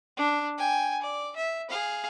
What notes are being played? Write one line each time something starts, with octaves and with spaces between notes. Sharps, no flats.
D4
G5 G#5
D5
E5
G#4 F5